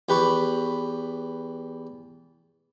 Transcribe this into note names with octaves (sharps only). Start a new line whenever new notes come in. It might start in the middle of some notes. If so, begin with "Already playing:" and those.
E2 G4 B4 B5 C#6